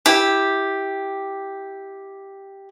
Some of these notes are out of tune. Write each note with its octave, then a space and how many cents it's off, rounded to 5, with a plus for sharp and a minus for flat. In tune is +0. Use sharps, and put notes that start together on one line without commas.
E4 -15 G4 +0